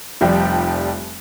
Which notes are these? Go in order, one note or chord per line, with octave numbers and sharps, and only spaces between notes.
F1 F3 G3 G4